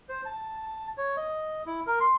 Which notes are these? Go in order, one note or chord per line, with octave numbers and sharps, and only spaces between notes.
C5
A5
C#5
D#5
E4
A#4
C6